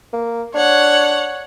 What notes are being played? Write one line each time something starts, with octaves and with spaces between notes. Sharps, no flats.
A#3
D4 C#5 F#5